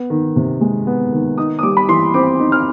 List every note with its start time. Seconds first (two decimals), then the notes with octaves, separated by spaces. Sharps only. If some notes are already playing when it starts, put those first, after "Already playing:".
Already playing: B3
0.10 D#3
0.36 C3
0.61 G#3
0.87 B3
1.13 D#3
1.38 D#4 D#6
1.59 D#6
1.63 G3 D6
1.77 B5
1.88 E3 C6
2.14 C4 D6
2.39 D#4
2.52 F6